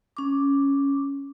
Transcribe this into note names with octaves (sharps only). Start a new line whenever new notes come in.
C#4 D6